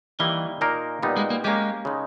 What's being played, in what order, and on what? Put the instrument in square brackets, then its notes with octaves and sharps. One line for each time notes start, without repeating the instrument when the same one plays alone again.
[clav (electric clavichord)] D#3 G3 A#3 E4 [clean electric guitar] E3
[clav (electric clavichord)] A#2 A#3 D#4 A#4
A#2 G3 B3 D#4
[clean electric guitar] G#3
A#3
[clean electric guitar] G#3 [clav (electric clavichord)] A#3 C#4 G4
[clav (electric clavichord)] C#3 G#3 D#4